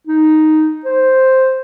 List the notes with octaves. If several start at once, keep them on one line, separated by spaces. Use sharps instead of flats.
D#4
C5